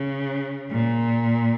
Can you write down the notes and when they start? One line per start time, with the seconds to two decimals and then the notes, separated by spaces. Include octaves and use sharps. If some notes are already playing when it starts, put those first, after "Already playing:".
Already playing: C#3
0.70 A#2